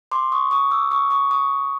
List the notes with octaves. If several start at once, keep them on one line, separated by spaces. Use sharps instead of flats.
C6 D6
C#6 D#6
C#6 D#6
D6 E6
C#6 D#6
C#6 D#6
C#6 D#6